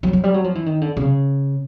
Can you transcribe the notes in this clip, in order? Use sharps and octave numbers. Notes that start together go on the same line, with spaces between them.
F#3
F#3
G3
F#3
F3
E3
D#3
D3
C#3